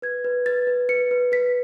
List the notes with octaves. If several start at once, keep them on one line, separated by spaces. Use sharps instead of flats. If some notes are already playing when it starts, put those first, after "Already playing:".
B4 G#6
B4
B4 A6
B4
B4 C#7
B4
B4 B6